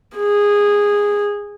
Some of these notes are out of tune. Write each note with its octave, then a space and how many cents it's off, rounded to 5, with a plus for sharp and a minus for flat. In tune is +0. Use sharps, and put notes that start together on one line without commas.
G#4 -15